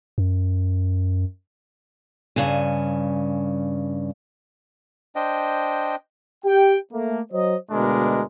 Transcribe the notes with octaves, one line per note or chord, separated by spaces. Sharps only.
F#2
G2 C#3 G#5
D4 C5 D#5 G5
G4 G5
A3 A#3
F#3 C5 D#5
D2 B2 G#3 D4 A#4